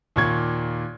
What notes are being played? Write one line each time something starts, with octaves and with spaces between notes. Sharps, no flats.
D#2 A#2 C#6 G#6